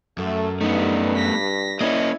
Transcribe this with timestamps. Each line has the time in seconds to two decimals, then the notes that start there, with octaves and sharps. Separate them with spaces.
0.18 F#2 A3 A4
0.61 G2 A3 B3 D#4
1.16 A#6 B6
1.81 A#3 C#4 E4 D5 D#5 G#6